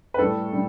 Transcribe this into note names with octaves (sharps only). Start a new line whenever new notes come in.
B4
A2 G3 A4
A2 G3